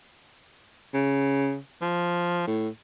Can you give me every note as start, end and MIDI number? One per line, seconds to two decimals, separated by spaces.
0.94 1.58 49
1.82 2.43 53
2.47 2.68 45